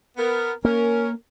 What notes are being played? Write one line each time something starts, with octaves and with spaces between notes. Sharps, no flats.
B3 A#4
A#3 C#4 A#4